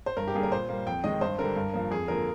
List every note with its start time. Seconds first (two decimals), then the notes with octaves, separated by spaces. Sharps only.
0.06 C5
0.17 G2 A#4
0.27 G4
0.34 D3 G3 A#3 G#4
0.43 A#4
0.52 A#2 C5
0.69 G3 A#3
0.86 F2 G5
1.04 D#3 G#3 D#5
1.21 G2 C5
1.38 D3 G3 A#4
1.56 G2
1.73 F3 A#3
1.91 F2 G#4
2.08 D3 F3 A#3 A#4